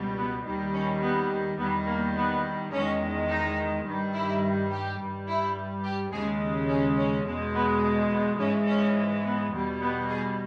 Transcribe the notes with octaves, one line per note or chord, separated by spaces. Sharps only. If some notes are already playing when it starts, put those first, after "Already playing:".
Already playing: C#2 B2 G3
B3
D#2 D#3 G3
C#4
B3
E2 D#3 G3 B3
A#3
B3
E2 D#3 G#3 C#4
D#4
G2 D#3 G3
E4
G4
G2 G3
E4
G4
D#2 C#3 G#3 G#4
C#4
C#4
E2 B2 G#3
B3
B3
G#2 E3 G#3 C#4
C#4
B3
E2 B2 G3
B3
G#4